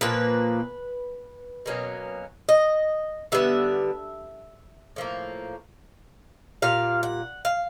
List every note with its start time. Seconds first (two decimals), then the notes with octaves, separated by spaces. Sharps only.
0.01 A#2 F3 A#3 B4
1.66 B2 F#3 A#3 C#4
2.49 D#5
3.32 D3 G3 B3 E5
4.96 A2 F3 A#3
6.62 A#2 G3 F5
7.03 F#5
7.45 F5